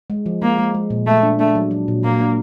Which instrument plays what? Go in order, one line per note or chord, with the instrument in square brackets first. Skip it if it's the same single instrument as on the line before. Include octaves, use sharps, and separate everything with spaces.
[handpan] G#3
F3
[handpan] G#3 [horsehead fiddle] A#3
[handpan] G#3
G#3
A#2
[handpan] A#2 [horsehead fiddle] A3
[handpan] D4
[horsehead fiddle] A3 [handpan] D4
[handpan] F#3
F#3
A#2
[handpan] A#2 [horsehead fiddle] A#3
[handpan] D4